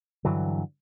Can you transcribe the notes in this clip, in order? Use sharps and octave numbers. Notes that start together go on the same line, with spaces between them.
G2 D3 E3 F#3